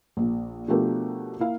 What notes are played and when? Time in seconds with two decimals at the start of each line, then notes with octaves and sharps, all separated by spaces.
0.17 A#1 A#2
0.68 B2 F3 A3 D4 G4 A#4
1.40 A#3 E4 F5